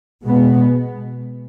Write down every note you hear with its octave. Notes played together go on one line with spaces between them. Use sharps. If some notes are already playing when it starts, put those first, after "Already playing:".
B2 G#3 B3